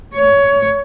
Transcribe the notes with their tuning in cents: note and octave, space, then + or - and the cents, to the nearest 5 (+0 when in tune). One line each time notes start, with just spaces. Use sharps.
C#5 +20